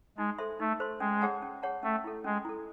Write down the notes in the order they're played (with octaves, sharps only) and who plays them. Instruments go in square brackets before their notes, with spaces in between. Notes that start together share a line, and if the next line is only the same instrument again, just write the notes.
[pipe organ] G#3 [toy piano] D#4
[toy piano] A4 C5 E5 C6
[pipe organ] A3 [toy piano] D#4
[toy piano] A4 C5 E5 C6
[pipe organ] G#3 [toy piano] C#4
[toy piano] G#4 C#5 F#5 A5
C#4
G#4 C#5 F#5 A5
[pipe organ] A3 [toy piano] C#4
[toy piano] E4 A4
[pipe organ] G#3 [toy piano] C#4
[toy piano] E4 A4